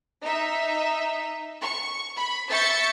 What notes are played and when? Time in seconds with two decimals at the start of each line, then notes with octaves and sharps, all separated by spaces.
0.22 D#4 E5
1.62 C#6
2.16 B5
2.49 E5 C#6 G6 A6 B6 C#7